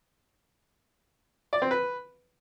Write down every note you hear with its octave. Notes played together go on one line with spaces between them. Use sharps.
D5
C4
B4